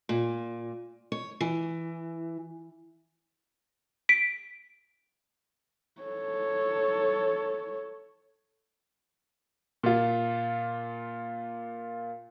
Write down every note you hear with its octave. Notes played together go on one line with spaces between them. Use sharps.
A#2
C#5
E3
B6 D7
A4 C#5
A#2 F4